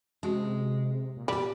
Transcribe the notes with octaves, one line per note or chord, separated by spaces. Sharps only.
C3 G#3 C#4 F#4 G#4
A#2
G3 B3 G4